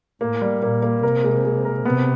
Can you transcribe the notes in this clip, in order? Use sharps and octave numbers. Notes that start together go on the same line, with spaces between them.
A2 A#3
G3
A#2 A#3
A#3
C3 A#4
G#3
G#3
A#4
C3 B3